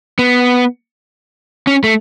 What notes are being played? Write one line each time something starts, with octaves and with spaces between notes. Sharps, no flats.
B3
C#4
A3